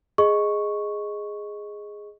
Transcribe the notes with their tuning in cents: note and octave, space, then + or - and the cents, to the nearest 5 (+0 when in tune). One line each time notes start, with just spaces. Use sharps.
G#4 +0 D#5 +0 C#6 +0